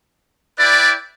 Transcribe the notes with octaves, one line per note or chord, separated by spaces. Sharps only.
E4 B4 D5 G5